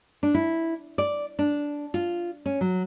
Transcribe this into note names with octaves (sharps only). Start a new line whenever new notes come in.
D4
E4
D5
D4
F4
C#4
F#3